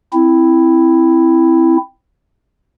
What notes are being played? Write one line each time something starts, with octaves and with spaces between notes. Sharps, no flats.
C4 E4